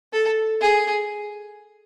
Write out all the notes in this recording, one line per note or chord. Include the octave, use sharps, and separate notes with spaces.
A4
G#4